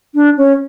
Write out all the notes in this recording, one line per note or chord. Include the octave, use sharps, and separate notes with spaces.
D4
C#4